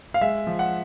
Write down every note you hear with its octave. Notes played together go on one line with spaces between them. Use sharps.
F5
G#3 E5
F3
F#5